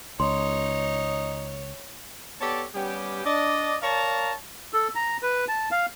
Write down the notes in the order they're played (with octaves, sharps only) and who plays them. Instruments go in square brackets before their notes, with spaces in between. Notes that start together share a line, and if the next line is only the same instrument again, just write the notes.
[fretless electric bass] C#2 [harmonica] D#4 [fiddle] C#5 [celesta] C6
[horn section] B3 G4 A4 C#5 D5 A5
G3 B3 C#4 G4
D4 D5 D#5
A#4 C#5 D5 F5 A5 A#5
[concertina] A4
A#5
B4
A5
F5